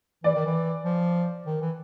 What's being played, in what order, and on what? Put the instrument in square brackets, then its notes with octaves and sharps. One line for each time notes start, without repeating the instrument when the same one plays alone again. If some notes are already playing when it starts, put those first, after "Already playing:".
[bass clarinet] E3 [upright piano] D5
[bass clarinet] D#3
E3
F3
D#3
E3